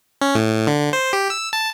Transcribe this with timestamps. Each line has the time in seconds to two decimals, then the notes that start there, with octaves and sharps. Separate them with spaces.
0.21 C#4
0.35 A2
0.67 D3
0.93 C5
1.13 G4
1.30 E6
1.53 A5